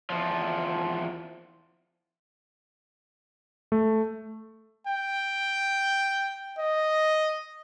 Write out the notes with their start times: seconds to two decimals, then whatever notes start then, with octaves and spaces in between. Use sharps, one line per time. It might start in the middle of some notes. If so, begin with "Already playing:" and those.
0.10 E2 F3
3.72 A3
4.87 G5
6.58 D#5